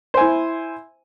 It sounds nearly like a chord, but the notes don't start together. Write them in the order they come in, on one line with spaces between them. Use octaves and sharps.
C5 G#5 E4